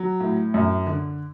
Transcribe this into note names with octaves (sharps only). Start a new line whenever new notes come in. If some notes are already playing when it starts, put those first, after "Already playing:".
Already playing: F#3
A2
F#2
D3